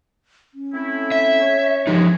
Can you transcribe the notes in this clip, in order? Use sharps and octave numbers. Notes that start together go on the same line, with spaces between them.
C#4
A3 C4 E4
E5
C#5
D#2 E3 F3 G#3 D#4